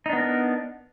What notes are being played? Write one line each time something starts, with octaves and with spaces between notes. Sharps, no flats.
B3 D4 D#4 A#4